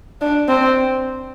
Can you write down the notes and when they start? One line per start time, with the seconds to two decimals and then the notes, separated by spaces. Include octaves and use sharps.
0.21 D4
0.48 C4